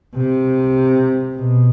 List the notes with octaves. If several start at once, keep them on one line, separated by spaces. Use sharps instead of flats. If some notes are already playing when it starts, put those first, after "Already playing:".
C3
B2